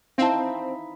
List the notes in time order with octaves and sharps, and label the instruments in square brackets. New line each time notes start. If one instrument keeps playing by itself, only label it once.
[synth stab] C4 [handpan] D#4 E4 [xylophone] F5 A5